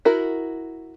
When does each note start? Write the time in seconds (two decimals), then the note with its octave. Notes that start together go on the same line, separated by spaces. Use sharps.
0.05 E4 F#4 A#4